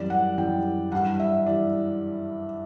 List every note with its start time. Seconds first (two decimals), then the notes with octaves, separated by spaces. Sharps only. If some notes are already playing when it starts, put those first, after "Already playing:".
Already playing: F#2 E3 G3 D5
0.10 F#5
0.37 F#2 E3 G3 G5
0.92 G2 E3 G3 F#5
1.20 E5
1.46 E3 G3 D5